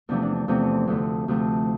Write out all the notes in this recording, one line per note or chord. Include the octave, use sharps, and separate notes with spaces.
E2 C3 F3 A3 D4
D4
D4
E2 C3 F3 A3 C4
D2 C3 F3 A3
D2 C3 F3 A3